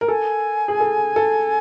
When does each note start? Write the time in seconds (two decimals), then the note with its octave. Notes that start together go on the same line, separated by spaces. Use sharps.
0.01 A#4
0.08 A4 G#5
0.68 G#4
0.80 A4
1.16 A4